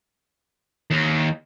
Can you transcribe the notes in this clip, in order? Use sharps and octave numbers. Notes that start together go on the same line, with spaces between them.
D#2